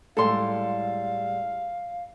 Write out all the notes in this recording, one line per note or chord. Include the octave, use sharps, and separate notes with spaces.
A2 G3 G#3 A4 F5 C6